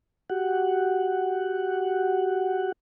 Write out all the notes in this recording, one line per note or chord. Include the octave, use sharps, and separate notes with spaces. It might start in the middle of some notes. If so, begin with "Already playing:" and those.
F#4 G4 F#5